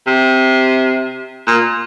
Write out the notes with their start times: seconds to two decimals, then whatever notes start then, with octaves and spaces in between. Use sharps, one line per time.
0.07 C3
1.47 A#2